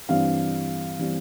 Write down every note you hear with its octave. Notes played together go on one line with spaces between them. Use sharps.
G2 E3 G3 C4 F5
E3 G3 C4